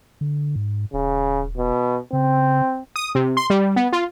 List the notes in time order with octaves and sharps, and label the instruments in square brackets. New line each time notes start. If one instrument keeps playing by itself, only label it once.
[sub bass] D3
G#2
[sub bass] D#1 [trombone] C#3
[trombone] B2
[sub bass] C#3 [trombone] C4
[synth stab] D#6
C3
C6
G3
B3
F4